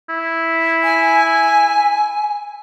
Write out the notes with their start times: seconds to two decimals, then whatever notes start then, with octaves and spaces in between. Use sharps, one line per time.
0.09 E4
0.84 G#5